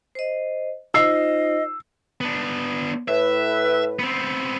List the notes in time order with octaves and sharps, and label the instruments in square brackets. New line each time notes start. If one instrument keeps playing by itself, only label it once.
[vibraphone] C5 D#5
[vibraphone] D#4 F4 C5 [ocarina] D#5 [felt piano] E6 C7
[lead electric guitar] B3 D4
[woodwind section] A2 B4 [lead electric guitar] E5
[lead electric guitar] B3 C4